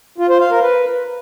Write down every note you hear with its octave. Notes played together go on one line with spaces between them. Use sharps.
F4
C5
F5
A#4
B4